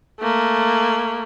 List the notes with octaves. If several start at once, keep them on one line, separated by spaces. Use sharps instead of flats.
A3 A#3